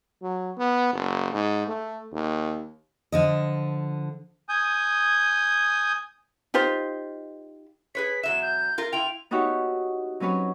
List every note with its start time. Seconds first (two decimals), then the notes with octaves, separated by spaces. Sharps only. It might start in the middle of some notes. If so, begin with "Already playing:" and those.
0.22 F#3
0.58 B3
0.93 F#1
1.33 G#2
1.68 A3
2.13 D#2
3.12 D3 F3 D#5
4.49 G#5 D#6 G6
6.54 D#4 F4 G4 C5
7.95 G#4 B4 C#5 B6
8.23 E2 F#3 E5 E7
8.42 G6
8.78 F4 A#4
8.93 E4 F4 G5 F7
9.31 B3 D#4 E4 F#4 G4 C#5
10.20 F#3 C4 C#4 B4 C#5